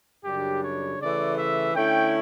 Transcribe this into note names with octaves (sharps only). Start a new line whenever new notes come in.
F#2 C#3 G3 D4 G4
C#5
C#3 E3 A3 D5
E5
D3 A3 C#4 E4 G5